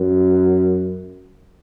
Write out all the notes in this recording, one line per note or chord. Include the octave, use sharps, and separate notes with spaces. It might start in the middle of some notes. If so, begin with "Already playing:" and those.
Already playing: F#2